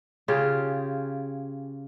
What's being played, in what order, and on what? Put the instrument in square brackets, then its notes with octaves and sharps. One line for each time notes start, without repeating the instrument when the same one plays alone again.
[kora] C#3 F4 G4 G#4